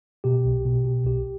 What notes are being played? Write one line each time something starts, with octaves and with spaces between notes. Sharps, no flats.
B2 G4
B1
B2
B2
B1 G4